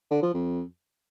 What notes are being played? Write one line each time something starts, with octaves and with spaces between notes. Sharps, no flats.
D3
F3
F2